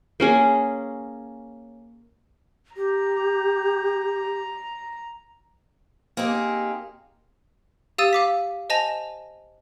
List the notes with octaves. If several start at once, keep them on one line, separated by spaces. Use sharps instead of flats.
A#3 C#4 G#4
G4 A#5
A#3 C4 D#4 G4 G#4
G4 F5 D#6 E6 A6 D#7
F5 D6 B6
C5 D#5 G#5 A5 A#6 F7